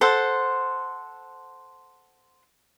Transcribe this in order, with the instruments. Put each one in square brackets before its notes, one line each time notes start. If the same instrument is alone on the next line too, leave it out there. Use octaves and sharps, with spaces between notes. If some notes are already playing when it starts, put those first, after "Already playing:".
[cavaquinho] A4 C5 F#5